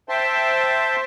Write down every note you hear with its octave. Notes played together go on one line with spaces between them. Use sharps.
C5 E5 G5 A5 C6